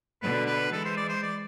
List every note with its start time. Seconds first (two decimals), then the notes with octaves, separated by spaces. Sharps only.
0.22 B2 D3 B4
0.46 B4
0.72 E3 G#3 A4
0.85 C5
0.97 D5
1.09 C5
1.23 D5